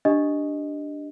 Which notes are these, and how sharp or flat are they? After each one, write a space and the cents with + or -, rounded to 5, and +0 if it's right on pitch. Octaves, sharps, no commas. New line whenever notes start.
D4 +0 G4 +0 D#5 +0